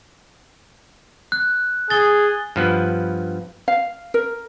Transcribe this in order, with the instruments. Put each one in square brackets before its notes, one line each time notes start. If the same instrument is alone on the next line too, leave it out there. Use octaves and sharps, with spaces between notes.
[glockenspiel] F#6
[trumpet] G#4 [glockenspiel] A6 G7
[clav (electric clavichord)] G2 F3 B3
[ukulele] F5
A#4